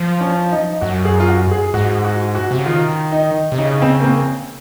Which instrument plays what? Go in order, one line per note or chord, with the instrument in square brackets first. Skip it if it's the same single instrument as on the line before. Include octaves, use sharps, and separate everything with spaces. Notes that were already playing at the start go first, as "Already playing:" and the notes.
Already playing: [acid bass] F3
[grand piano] C#4
D#4
[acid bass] F#2 [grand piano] F#4
[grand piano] G#4
F4
F#4
G#4
[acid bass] G#2 [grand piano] F#4
[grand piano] F#4
F#4
[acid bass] C3
C#3
[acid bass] D#3 [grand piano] F4
[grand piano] D#4
[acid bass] C3
[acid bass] C#3 [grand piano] D#4
[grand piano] C4
A#3
C4